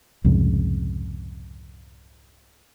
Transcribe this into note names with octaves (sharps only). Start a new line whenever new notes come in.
C2 F2 G#2 C#3